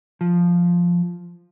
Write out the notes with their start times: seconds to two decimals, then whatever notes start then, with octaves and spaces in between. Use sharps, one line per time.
0.21 F3